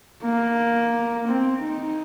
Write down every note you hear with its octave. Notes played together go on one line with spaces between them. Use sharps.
A#3
C4
D#4